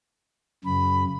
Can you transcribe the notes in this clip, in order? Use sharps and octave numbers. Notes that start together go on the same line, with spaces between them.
F#2 C#3 B5